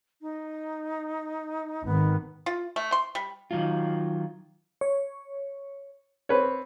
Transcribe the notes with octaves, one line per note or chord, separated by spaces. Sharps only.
D#4
G#1 D#3 B3
F4
A3
C6
G3
D#3 F#3 F4
C#5
C4 B4 C#5